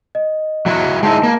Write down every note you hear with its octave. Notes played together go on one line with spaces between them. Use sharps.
D#5
F#3 E4 F#4
G#3 D#4 E4 A5
A#3